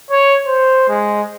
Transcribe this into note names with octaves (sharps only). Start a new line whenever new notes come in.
C#5
C5
G#3